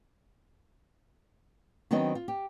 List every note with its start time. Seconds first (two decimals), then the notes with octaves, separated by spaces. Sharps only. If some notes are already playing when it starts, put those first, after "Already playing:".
1.91 D#3 F#3 B3 C4 D4 D#5
2.15 F4
2.28 G4